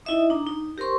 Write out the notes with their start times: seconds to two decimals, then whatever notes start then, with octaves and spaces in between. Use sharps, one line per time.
0.05 D#4 E4 D#5 E5 D#6
0.30 D4 D#4 A#5
0.47 D#4
0.78 G4 A#4 C5 C6 C#6